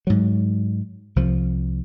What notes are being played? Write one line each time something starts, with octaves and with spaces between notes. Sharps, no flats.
G#2 F#3
C2 F3